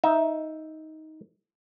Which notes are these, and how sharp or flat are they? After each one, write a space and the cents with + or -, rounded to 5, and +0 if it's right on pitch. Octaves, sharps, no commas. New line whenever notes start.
D#4 +15 E5 +0